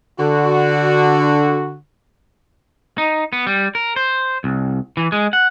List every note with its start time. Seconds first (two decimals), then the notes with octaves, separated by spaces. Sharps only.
0.19 D3 F#4
2.98 D#4
3.33 B3
3.47 G3
3.75 A#4
3.96 C5
4.44 C2
4.97 E3
5.12 G#3
5.33 F#5